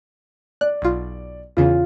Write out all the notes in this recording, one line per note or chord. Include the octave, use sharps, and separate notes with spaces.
D5 F#6
B1 F4
E2 C#3 F4